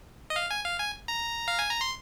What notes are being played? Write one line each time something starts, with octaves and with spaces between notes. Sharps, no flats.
D#5
F5
G#5
F5
G#5
A#5
F5
G#5
A#5
C6